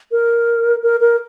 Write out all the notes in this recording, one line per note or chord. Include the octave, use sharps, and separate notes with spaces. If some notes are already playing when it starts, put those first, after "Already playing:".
A#4
A#4
A#4